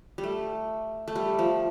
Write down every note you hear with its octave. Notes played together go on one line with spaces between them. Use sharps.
G3
A3
A3
G3
F3